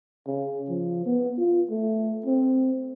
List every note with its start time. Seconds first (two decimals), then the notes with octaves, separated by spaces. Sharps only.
0.27 C#3
0.69 F3
1.05 B3
1.38 F4
1.70 A3
2.25 C4